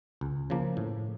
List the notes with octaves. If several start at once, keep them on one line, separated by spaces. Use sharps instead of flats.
C#2
C#3 F3 A#3
A2